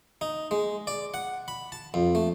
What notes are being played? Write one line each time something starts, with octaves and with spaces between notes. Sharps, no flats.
D#4
G#3
D5
F#5
B5
A5
F2
A3